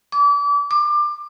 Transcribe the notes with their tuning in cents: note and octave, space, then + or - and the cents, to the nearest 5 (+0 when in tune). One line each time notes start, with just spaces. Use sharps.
D6 -35
D6 +25